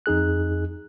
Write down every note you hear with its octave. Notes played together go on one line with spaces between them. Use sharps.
F2 D#4 G#4 F#6